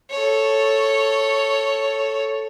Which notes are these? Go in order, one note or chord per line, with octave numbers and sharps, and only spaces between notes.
A4 C#5